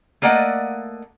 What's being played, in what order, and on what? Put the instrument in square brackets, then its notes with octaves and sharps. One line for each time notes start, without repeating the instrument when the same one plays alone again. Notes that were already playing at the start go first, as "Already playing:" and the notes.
[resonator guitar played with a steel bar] A3 A#3 D5 D#5 F#5